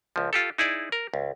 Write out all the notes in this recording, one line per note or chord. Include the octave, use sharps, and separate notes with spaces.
C#2 F3
F4 G4 A4
D#4 E4 G#4 D5
A#4
C#2